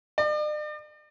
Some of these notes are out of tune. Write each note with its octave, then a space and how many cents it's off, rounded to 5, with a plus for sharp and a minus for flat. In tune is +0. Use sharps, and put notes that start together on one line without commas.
D5 +45